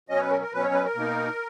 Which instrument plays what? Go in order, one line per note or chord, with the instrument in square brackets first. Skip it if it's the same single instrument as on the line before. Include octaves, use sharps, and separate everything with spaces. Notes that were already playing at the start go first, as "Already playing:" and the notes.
[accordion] B2 F#3 C#4 D#5
C#5
B4
A#4
A#4
B2 F#3 C#4 B4
C#5
B4
A#4
B2 A#3 D#4